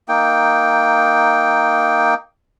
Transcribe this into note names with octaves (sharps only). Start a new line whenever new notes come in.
A#3 D#4 G5